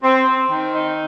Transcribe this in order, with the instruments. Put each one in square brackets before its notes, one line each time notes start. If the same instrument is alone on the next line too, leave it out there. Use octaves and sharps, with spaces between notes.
[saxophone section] C4
C4
D#3
D#4